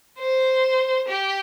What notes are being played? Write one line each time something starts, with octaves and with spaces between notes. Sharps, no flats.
C5
G4